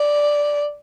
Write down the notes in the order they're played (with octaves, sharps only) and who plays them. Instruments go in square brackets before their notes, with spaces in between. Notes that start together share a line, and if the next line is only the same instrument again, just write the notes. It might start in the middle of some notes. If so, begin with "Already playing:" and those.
Already playing: [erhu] D5